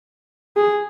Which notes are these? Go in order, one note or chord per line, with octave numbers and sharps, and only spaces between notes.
G#4